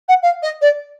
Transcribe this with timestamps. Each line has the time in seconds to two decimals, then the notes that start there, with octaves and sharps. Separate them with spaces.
0.09 F#5
0.23 F5
0.43 D#5
0.62 D5